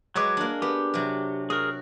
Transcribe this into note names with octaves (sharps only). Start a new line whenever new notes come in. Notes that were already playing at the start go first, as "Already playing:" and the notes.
F#3 G#3 G#4 B4 C#5 D6
A#3 D4
B3 G4
C3 F#3
F#4 G#4 A#4